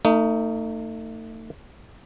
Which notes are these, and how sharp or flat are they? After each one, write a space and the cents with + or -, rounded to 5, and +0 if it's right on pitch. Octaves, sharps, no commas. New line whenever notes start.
A3 +35 D#4 +0